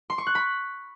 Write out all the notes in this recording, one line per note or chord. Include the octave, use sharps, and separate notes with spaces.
C6
C#6
F#6
B5